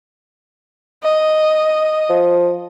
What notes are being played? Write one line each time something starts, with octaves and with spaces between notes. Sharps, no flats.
D#5
F3